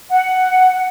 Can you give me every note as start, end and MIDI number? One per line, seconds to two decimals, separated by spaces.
0.10 0.86 78